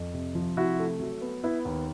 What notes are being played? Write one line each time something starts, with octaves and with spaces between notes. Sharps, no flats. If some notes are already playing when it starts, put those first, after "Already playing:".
Already playing: F2
C3
F3
C3 E4 F#4
A3
F#3
B3
B3 E4
D#2